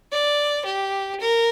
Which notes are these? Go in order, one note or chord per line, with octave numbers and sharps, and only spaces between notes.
D5
G4
A#4